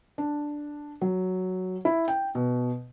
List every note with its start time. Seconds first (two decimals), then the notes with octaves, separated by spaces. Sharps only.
0.18 D4
1.01 F#3
1.85 E4
2.08 G5
2.35 B2